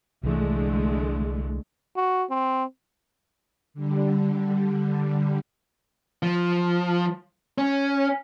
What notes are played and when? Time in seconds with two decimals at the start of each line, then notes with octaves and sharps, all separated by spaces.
0.23 C2 D3 E3 G#3 A3
1.96 F#4
2.30 C4
3.74 D3 G3
6.23 F3
7.58 C#4